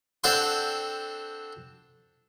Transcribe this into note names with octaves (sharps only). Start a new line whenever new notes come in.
C4 D4 A4 F#5 G5 C6